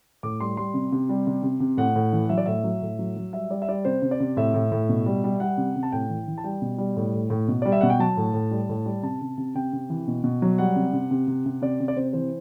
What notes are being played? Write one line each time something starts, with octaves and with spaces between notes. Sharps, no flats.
A2 D6
G3 C6
G3 C6
C3
C3
G3
C3
C3
C3
A2 F#5
A2
E3
F#3 E5
D5
A2 E5
F#3
A2
F#3
F#3
G3 E5
G3 D5
E5
G3 D5
C3 C5
C3
D5
C3
A2 E5
A2
A2
B2
G3
G3
G3 F#5
C3
C3
A5
A2 G5
E3
E3
A5
G3 G5
B2
G3
A2
A2
A2
B2
G3 D5
E5
B2 F#5
G5
F#3 A5
A2
A2
G3
A2
G3
C3 A5
C3
C3
C3 G5
C3
E3
B2
B2
F#3
G3 F#5
C3
C3
C3
C3
C3
C3 D5
C3
D5
C3 C5
E3 C5